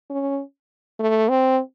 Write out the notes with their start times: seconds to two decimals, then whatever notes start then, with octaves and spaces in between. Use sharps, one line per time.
0.10 C#4
1.00 A3
1.29 C4